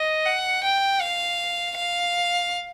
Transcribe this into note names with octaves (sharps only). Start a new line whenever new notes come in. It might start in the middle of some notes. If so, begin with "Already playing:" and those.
Already playing: D#5
F#5
G5
F5
F5